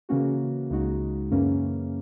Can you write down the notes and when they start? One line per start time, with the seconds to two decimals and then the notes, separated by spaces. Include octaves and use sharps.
0.09 C#3 E3 A#3 C#4 F#4
0.70 C#2 C#3 G#3 D#4 F#4
1.31 F#2 C#3 E3 A#3 C#4